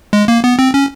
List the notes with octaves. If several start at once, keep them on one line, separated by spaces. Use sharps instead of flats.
G#3
A#3
B3
C4
C#4